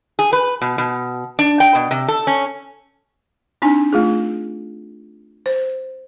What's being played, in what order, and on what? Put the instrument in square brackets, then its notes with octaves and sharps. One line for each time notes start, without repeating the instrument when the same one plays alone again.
[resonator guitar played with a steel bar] G#4
B4
B2
B2
D4
G5
B2
C3
A4
C#4
[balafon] C4 D4 D#4 G#5
A3 F4 G#4
C5